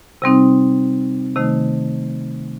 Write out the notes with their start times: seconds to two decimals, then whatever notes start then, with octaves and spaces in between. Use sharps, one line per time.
0.22 C3 G3 C4 D#4
1.36 C3 D#3 A3 D#4